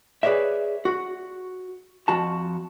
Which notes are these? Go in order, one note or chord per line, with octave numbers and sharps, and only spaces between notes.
G#4 B4 C#5 D5 E5
F#4
F2 F#4 A5